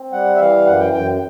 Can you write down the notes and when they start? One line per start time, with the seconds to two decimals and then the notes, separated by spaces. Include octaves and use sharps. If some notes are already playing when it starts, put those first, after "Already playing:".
Already playing: C4
0.13 G3 F#5
0.36 E5
0.40 E3 F5
0.66 F#2 F#5
0.80 G5
0.93 F#2 G5